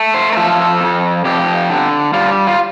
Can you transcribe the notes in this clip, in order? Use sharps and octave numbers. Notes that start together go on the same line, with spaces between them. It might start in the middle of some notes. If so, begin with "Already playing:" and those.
Already playing: A3
C5
A#4
F3 A4
F2
F2 G4
D3
G3 F4
F4